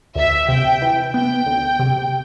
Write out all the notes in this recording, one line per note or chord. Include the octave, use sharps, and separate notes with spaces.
D2 E5
C3 G5
E3
B3 G5
D2
C3